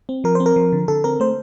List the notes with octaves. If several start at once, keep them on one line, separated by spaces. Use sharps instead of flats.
C4
F3 A#4
C4 C5
A#4
F3
D3
D3 A4
C4 A#4
A3 C5